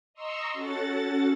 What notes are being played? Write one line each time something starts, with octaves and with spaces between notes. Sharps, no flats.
D#5 A#5 C6 C#6 E6
C#4 F#4 A4 F#5 A6